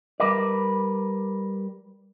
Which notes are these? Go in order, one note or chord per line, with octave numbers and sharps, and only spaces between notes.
G3 A#4 B4 D5